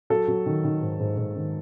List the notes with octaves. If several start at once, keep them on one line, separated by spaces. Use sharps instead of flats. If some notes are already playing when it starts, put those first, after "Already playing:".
F#3 A4
F#3
D#3
D#3
G#2
G#2
G#2
D#3